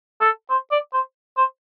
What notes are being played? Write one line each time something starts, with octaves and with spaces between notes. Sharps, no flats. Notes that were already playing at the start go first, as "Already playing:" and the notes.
A4
C5
D5
C5
C5